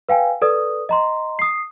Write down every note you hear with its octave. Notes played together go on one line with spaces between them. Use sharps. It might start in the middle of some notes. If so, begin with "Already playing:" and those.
B4 F5 G5 G#5
A4 B4 D5 D#6
D#5 A#5 C6
D#6 C7